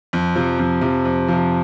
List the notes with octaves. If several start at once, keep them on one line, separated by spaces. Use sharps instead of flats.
F2
C3 F3
F2
C3 F3
F2
C3 F3